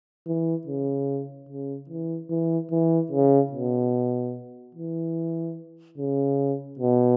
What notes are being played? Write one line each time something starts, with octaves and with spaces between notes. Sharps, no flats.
E3
C#3
C#3
E3
E3
E3
C#3
B2
E3
C#3
B2